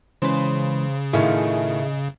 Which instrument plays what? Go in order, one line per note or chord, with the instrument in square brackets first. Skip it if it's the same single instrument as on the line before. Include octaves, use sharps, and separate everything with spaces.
[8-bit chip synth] C#3 [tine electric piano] E3 G#3 C#4 [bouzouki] B4 C5
[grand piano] A2 D#3 [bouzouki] A3 C#4 F4 [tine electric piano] G#4 D#5